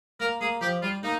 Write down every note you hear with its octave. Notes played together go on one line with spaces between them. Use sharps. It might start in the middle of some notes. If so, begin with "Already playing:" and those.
A#3 A#4
A#3 G#4
F3 G4
G3 F4
A#3 D#4